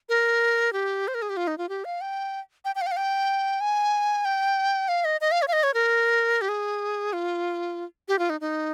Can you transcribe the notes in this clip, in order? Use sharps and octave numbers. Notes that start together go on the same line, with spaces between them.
A#4
G4
C5
A#4
G#4
G4
F4
D#4
F4
G4
F5
G5
G5
G5
F5
G5
F5
G5
G#5
G5
F5
D#5
D#5
F5
C#5
F5
D#5
C#5
A#4
G4
G#4
F4
G4
F4
D#4
D#4